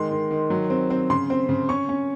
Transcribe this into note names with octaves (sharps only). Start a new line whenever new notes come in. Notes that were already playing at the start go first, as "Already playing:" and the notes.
Already playing: D#3 G#3 C6
D#3
D#3
F#3
C4
C4
C#3 C6
C4
C#3
C#4 C#6
C#4